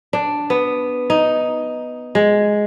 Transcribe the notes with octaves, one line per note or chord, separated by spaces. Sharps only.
D4
B3
D#4
G#3